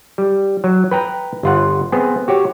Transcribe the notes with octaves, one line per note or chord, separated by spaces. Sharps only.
G3
F#3
B4 G5 A#5
G1 F4 F#5
B3 C4 G#4
F#4 G4 C#5